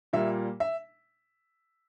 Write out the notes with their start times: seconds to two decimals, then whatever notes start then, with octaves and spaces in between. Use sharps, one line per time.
0.13 A#2 G3 A#3 E5
0.60 E5